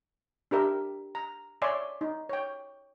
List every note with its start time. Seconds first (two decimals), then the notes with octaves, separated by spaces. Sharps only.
0.51 D4 G4 A#4 E5
1.15 A#5
1.62 C#5 D5 E5 G#5 C6
2.01 D#4
2.29 C#5 G5